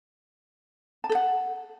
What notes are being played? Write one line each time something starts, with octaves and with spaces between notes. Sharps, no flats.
A5
A4
F#5